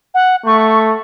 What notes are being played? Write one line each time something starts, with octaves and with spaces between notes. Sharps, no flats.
F#5
A3 C#6